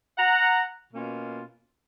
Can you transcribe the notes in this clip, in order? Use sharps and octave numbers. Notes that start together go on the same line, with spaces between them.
F#5 A#5
B2 A#3 C#4 F4